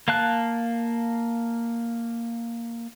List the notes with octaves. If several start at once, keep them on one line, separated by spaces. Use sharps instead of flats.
A#3 F5 A5 F#6